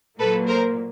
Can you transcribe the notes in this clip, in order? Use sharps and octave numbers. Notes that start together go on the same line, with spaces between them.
A#2 F#3 A#3 A4 B4
A#4 C5